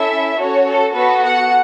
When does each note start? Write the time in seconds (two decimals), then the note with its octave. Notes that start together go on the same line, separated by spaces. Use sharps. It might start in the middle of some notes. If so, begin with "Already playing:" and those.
Already playing: C#4 E4 A4 E5
0.38 C#4 F#4 A4 C#5
0.67 A4
0.95 B3 F#4 A4 B4
1.24 F#5